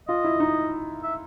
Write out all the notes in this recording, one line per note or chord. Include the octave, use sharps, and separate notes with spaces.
F4 D#5
E4
D#4
E5